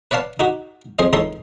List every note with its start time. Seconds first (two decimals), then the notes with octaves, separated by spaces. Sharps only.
0.11 B4 C#5 D5 F5 A5
0.40 D#4 F#4 G4
0.99 F2 G#4 C5 D#5
1.13 C#2 E3 D#4 A4 C#5 C6